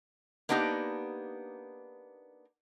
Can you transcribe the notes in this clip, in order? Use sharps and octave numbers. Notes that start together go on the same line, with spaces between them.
A#3 B3 D4 D#4 G4